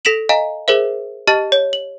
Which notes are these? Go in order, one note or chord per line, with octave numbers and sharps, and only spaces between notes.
A4 A#6 B6 D7 E7 F#7
D#5 F5 G#5 A#5
G#4 A#4 C5 E5
G4 D#5 A5 F6 A6 F#7
C#5
F#7